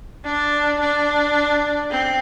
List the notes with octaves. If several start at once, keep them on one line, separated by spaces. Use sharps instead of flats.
D4
D4
C4